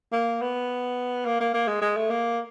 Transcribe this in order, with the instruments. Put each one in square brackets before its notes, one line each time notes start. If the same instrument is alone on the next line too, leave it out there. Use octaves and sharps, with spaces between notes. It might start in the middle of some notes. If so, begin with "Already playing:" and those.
[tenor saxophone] A#3
B3
A#3
A#3
A#3
G#3
G#3
A3
A#3